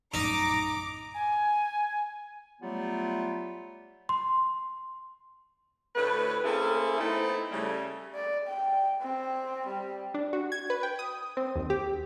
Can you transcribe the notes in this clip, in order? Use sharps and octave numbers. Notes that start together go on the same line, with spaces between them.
A#1 F#2 A2 D#4 A#5 D6
G#5
F#3 G3 A3 B3 F4 G4
C6
D2 A2 A3 B4
A#3 C4 C#4 E4 G#4 A4
A3 B3 C4 D#4 E4
C#3 G3 A3
D5
G5
C4
G3
D4
F#4
G#6
B4
G5
D#6
C4
D#2
G4